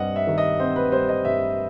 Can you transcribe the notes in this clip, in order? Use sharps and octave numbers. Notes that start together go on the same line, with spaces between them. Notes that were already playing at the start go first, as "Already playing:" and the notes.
Already playing: G2 G3 C4 D#5 F#5
E5
D#3
D#5
C4 C5
B4
G3 C5
D#5
G2 E5